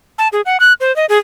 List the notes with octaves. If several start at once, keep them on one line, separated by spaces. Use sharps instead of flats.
A5
G#4
F#5
F#6
C5
D#5
G#4